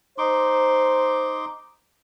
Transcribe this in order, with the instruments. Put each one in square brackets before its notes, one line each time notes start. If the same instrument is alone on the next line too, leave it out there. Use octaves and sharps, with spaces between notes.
[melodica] D#4 C6 D6 [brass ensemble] C5